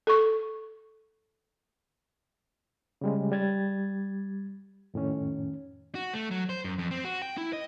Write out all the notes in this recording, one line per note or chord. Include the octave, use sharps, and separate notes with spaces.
A4 C#6
C#3 G3 G#3
G3 G#6 A6
F2 A2 D#3 C#4
F#4
A3
F#3
C5
F#2
F2
C4
F#4
G5
E4
D#5